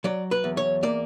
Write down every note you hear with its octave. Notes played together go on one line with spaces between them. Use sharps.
F#3 D5
B4
E2
C#5
A#3 D5